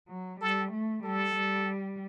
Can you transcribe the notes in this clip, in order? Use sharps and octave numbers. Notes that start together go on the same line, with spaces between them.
F#3
G3 A4
A3
G3 A4
G3